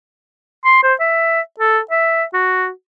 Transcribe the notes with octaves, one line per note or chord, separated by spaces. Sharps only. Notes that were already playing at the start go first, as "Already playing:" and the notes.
C6
C5
E5
A4
E5
F#4